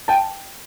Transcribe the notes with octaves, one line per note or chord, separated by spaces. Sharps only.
G5 A5